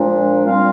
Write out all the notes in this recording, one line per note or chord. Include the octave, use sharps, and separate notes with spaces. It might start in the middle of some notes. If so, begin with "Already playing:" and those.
Already playing: A#2 F3 G#3 D4
A#2 G3 C4 F4 F5